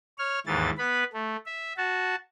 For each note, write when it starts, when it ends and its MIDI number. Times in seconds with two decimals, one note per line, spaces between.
0.18 0.39 73
0.18 0.39 89
0.47 0.70 39
0.47 0.70 44
0.47 0.70 52
0.47 0.70 93
0.78 1.04 59
0.78 1.04 71
0.78 1.04 83
1.13 1.36 57
1.46 1.73 76
1.77 2.15 66
1.77 2.15 81